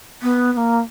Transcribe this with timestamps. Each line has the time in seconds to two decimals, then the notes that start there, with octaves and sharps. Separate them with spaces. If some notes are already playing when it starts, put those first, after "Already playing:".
0.22 B3
0.53 B3
0.57 A#3